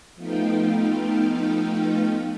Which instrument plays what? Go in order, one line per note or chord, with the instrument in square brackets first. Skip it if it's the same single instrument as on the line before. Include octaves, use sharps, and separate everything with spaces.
[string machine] F3 A3 B3 D#4 F5 G5